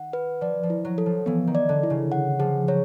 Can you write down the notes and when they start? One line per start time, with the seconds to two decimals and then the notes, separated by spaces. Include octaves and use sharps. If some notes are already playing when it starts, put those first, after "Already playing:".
Already playing: D#3 F#5
0.13 B4
0.41 F3 D5
0.63 F3
0.70 E4
0.85 F#3
0.98 A4
1.06 F3
1.26 E3 B3
1.47 D#3
1.55 D5
1.69 D3
1.83 E4
1.90 C#3
2.12 F#5
2.39 F3 G#4
2.68 F#3 C#5